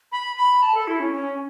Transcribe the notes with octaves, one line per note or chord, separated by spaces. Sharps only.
B5
B5
A5
A4
E4
C#4
C#4